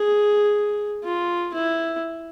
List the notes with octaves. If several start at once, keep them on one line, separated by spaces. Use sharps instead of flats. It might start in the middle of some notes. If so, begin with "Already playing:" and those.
Already playing: G#4
F4
E4